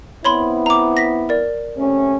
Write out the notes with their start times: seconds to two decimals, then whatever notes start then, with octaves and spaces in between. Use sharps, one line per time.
0.24 B3 C4 E4 C#5 B5 C6
0.66 A#5 D6
0.97 A#6 B6
1.29 A#4 D5
1.76 C3 A3 C#4